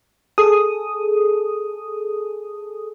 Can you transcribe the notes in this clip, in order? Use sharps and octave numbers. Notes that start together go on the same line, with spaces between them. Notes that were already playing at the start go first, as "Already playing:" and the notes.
G#4 A4 D#6